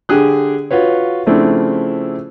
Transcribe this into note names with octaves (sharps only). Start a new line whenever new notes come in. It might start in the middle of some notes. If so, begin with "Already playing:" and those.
D3 G4 G#4 F#6
F4 F#4 B4 C#5
C#3 F3 A3 C4 D4 E4